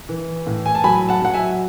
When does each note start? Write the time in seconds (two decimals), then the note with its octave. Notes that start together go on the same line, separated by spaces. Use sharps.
0.09 E3
0.47 A2
0.66 G#5
0.75 A5
0.84 F#3 G#5 B5
1.09 F#5 A5
1.22 F#3 F#5
1.34 E5 G#5